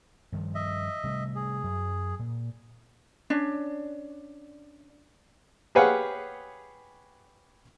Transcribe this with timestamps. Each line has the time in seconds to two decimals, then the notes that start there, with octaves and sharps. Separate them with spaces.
0.32 G2 D#3 F3
0.55 D#5 E5
1.04 C3 G3 A3
1.36 G#4
1.64 F#2 F#3
2.19 A#2
3.30 C#4 D4
5.75 G4 G#4 B4 C#5 F5 F#5